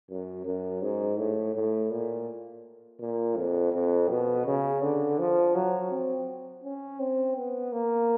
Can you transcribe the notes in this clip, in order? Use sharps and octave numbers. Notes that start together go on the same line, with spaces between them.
F#2
F#2
G#2
A2
A2
A#2
A#2
F2
F2
B2
C#3
D3
F3
F#3
C4
C#4
C4
B3
A#3